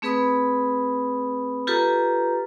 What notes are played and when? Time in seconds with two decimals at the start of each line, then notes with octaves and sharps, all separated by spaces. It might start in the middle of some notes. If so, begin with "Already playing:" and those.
0.02 A3 C4 G#4 B4 B5 D#6
1.67 F4 G4 A4 B4 A#5